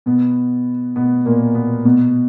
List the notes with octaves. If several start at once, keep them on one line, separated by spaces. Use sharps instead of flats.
B2 B3
B2 B3
A#2 A#3
B2 B3
B2 B3